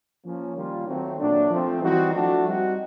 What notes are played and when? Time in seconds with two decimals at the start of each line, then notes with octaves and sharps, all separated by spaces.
0.25 F3 A#3 C#4
0.56 D#3 G3 A#3 C#4 F4
0.88 D#3 F#3 A3 C4
1.19 A#2 F#3 A3 D4
1.51 F3 A3 C4
1.82 E3 G3 C4 D#4 F#4
2.13 F3 A3 D4 F#4
2.45 G3 C4 D#4 F#4